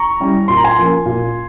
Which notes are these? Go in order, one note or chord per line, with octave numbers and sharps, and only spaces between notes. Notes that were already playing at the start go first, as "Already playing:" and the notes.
Already playing: A#5 C#6
G3 C#4 E4
A#2 C6
A#5
G#5 C6
F3 A#3 C#4
A#2